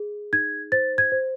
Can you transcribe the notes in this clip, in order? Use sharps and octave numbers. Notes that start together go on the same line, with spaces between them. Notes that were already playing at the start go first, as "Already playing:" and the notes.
Already playing: G#4
D#4 G#6
C5 A6
G#6
C5